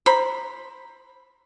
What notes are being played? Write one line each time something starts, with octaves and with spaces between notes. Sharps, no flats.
C5 A#5 B5